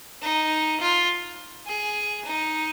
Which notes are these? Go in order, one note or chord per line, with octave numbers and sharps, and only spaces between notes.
D#4
F4
G#4
D#4